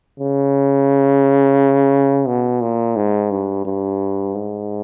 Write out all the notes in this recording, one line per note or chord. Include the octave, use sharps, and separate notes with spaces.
C#3
B2
A#2
G#2
G2
G2
G#2